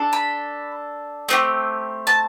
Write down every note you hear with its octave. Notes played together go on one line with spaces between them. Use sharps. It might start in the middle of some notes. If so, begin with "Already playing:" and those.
Already playing: D4 A4
B5
A3 C4 E4 G4
A5